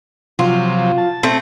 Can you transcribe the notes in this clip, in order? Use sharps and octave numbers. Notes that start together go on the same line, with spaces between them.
C3 F3 F#3 F4
A5
A3 C4